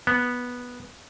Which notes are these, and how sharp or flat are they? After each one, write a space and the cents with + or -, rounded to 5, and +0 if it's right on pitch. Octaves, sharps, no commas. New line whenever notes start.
B3 -10